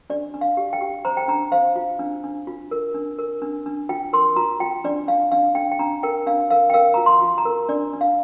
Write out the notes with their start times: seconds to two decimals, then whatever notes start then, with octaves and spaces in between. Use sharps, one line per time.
0.10 D4 D5
0.34 D4
0.41 F5
0.57 G4
0.73 G5
0.81 G4
1.05 C5 A#5
1.17 G5
1.28 D4 A#5
1.52 C5 F5
1.76 F4
1.99 D4
2.24 D4
2.47 F4
2.71 A#4
2.95 D4
3.19 A#4
3.42 D4
3.66 D4
3.89 F4 G5
4.13 A#4 C6
4.36 F4 A#5
4.60 F4 G5
4.84 D4 D5
5.08 D4 F5
5.32 D4 F5
5.55 D4 G5
5.72 G5
5.79 D4 A#5
6.03 A#4 G5
6.27 D4 F5
6.50 A#4 F5
6.70 G5
6.74 A#4 F5
6.94 F4 A#5
7.06 C6
7.22 F4
7.38 A#5
7.45 A#4
7.69 D4 D5
7.93 D4
8.01 F5